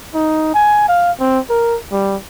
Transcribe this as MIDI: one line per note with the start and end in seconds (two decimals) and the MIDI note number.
0.14 0.53 63
0.54 0.86 80
0.88 1.11 77
1.20 1.39 60
1.50 1.77 70
1.92 2.17 55